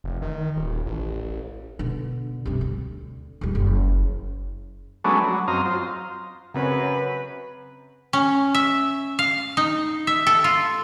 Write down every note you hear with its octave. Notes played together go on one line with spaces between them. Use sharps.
F1
D#3
D#1
A1
B2 D3
G2 C3
D2
D#1 G3
F#1
F#3 G#3 A3 B3 C#4 D4
F#3
F#2 C4 D#5 F5 A#5
F4 C5
F#2 C#3 C4 B4 C#5
C#4
E5
F5
D#4
E5
A4
F4